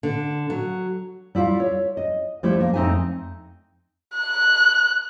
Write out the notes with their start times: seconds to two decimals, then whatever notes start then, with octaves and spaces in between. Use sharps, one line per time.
0.03 D3
0.50 F#3
1.35 G3 E4 F4 F5
1.60 C#5
1.97 D#5
2.43 F3 G3 A3 E4
2.60 A#3
2.74 F2 C4 D#4 E5 G#5
4.16 F#6